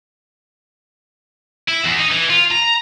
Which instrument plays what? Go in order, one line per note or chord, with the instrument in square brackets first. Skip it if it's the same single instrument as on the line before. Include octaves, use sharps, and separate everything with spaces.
[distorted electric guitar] E4
E2
D#4
E3
F4
A#5